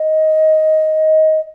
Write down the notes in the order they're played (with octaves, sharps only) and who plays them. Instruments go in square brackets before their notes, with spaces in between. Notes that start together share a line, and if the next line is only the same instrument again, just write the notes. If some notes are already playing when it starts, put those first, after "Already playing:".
Already playing: [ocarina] D#5